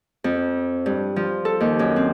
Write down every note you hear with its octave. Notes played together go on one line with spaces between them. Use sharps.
F2
G2
F3
A4
D#2
F#2
C4